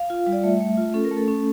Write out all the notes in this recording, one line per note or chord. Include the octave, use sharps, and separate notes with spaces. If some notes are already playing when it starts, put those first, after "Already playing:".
Already playing: F5
F4
G3
D5
A3 E5
A3
F4
C#4 A4
A#4
A3
A4
C#4